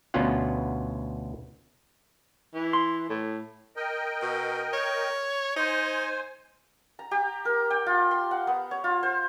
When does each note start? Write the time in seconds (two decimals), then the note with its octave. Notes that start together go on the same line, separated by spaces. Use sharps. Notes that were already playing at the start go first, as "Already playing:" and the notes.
0.14 D2 B2 B3 C#4 F4 F#5
2.55 E3
2.73 C6
3.10 A2
3.76 A#4 D#5 G5
4.22 B2
4.73 C#5
5.56 D#4 C5 G#5
6.99 A#5
7.11 G4
7.45 A#4
7.70 G5
7.86 F4
8.11 C6
8.31 F#5
8.47 B3
8.71 C#5
8.84 F4
9.03 C5